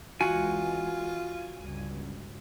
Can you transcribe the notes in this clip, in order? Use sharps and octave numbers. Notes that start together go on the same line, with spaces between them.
C#2 E3 G#3 F4 F#4 G#5
G1 C#2 G2